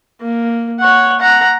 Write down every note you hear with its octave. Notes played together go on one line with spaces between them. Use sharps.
A#3
C#5 F#5
F#5 A#5